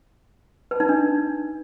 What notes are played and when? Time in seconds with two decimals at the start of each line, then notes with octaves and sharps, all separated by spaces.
0.71 B4
0.80 D#4
0.89 D4